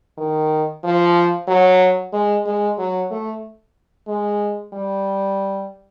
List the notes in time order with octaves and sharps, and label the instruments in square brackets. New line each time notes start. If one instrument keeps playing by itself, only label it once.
[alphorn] D#3
F3
F#3
G#3
G#3
F#3
A3
G#3
G3